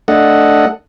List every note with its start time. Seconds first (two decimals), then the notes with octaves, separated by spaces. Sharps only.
0.08 A3 D4 A4 D#5 F#5